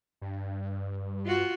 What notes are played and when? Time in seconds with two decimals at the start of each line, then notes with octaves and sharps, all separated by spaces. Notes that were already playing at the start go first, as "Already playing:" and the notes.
0.21 G2
1.25 F4 F#4